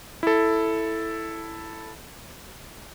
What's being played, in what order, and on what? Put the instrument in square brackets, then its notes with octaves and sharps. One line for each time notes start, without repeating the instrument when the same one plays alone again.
[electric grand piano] E4 A4